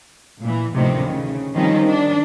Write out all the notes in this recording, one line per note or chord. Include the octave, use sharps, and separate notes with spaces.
A#2 E3
D2 A2 C3 D#3 F3
C#3
D#3 F3 G3 C4 C#4 D#4
D4